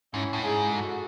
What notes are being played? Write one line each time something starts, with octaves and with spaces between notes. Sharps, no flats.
G#2 C#4 E4
A2
G#2 E4 G#4
F#4 A4